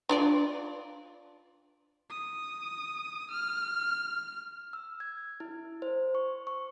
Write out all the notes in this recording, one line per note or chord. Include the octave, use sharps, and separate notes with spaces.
D4 F4 D5
D#6
F6
E6
G#6
E4
C5
C#6
C#6